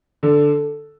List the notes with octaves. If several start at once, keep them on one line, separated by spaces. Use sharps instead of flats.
D3 A4